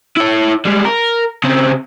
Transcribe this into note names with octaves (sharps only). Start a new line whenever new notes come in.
E4 C#5
G3 G#3
A#4
C#3 C4